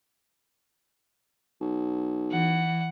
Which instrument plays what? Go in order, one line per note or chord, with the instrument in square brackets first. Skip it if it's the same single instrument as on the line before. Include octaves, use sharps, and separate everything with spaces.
[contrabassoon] B1
[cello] E3 [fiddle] F#5